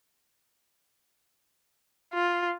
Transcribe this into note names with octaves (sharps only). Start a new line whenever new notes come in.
F4